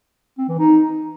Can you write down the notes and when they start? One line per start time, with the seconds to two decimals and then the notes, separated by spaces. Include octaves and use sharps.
0.38 C4
0.48 E3
0.59 D#4